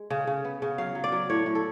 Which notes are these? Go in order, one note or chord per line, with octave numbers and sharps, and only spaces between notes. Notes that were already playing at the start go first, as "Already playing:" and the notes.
Already playing: G#3
C#3
C#3
B3
C#3
F#3 F5
F#3
D5
F#3
A2 C#5
A2
A4